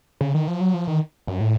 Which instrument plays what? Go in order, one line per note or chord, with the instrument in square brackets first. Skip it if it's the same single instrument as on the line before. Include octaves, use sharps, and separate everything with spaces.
[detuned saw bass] C#3
D#3
F3
F#3
F3
D#3
F#2
A2